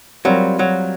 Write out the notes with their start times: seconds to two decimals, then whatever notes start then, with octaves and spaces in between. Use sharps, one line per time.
0.25 F#3 G3 C4 F4 A#4
0.59 F#3